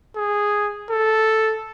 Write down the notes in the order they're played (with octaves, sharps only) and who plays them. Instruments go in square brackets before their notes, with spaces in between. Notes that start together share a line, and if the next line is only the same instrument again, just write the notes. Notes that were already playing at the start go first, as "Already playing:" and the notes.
[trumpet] G#4
A4